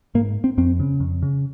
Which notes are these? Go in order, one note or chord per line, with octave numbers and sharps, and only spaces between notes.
G#2 A#3
C4
F2 C4
C#3
F2
C#3